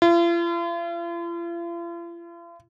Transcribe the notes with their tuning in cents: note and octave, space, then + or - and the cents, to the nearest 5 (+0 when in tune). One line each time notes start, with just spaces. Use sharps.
F4 -45